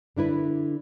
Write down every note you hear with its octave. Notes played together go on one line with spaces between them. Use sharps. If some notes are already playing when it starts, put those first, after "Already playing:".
D3 D4 E4 B4